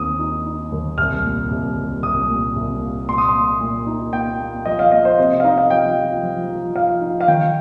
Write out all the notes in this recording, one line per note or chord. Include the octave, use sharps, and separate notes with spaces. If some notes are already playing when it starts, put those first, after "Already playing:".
Already playing: D#2 D#3 C4 D#4 D#6
D#4
D#4
D#2
C2 F6
A#2
C2
C2
C2 D#6
A#2
C2
A#3
A#2 C6
D#6
C6
A#3
A#2
D#4
A#3 G5
A#3
F3 D#5
F5
A#3 D#5
C5
C3 D#5
F5
D#4 D#5
F5
F3 G5
F3
F3
F3
F3 F5
D#4
F5
D#3 G5